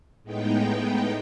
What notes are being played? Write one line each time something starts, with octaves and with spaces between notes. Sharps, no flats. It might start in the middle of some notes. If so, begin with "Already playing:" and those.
A2 G#3 B3 D#4 G5